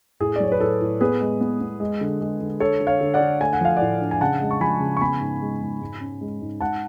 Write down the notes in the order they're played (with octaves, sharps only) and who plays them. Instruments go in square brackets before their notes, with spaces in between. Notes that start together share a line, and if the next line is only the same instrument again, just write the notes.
[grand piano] A2 G#4
D5
F#3 C#5
B4
A2 A4
A2
B3 G#4 B4
G#3
B3
B3
G#3
D3
G#3
D3
D3 A4 C#5
D3
C#5 F5
D3
D5 F#5
D3
A3 G#5
F#5
F3 F5
A2 D5 F#5
D4
G#5
C#3 F#5 A5
G#3
C#6
F3 G#5 B5
C#3
C#6
B3 G#5 B5
G#2
G#3
G#2
G#2
C#4
G#3
G#2
G#2 F#5 A5